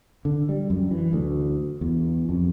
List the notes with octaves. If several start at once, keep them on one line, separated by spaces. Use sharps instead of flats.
D3
G3
F#2
E3
D2
E2
F2